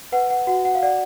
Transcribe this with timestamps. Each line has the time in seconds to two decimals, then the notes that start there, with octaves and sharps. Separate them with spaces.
0.12 B4 F#5
0.30 F#5
0.47 F#4 F#5
0.65 F#5
0.75 F5
0.82 D5 F#5